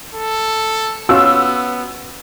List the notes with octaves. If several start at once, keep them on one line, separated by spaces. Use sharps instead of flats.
A4
B3 C#4 F4 F#4 E6